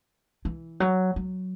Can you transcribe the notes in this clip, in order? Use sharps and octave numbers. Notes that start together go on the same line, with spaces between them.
E3
F#3
F#3